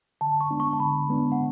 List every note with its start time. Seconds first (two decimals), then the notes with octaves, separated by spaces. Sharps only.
0.21 D3 A5
0.41 C#6
0.51 G#3 B3 D4
0.60 C#6
0.73 A5
0.80 D3 B5
1.09 G#3 B3 D4
1.32 F#5